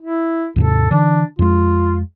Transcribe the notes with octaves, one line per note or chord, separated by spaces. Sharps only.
E4
D#2 G#2 C3 A4
D3 E3 D4
F2 G#3 F4